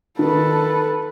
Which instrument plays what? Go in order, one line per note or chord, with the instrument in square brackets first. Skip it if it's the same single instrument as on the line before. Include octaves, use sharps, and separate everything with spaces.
[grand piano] D#3 [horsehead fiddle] A4 B4